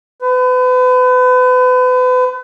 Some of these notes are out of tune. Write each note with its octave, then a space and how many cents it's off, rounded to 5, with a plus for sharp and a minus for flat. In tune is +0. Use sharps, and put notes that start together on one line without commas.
B4 +35